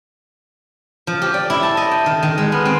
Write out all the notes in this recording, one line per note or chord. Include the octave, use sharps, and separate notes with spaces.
F3
G4
D5
E4
A5
D#5
G5
D#3
D#3
G#3
B3
C4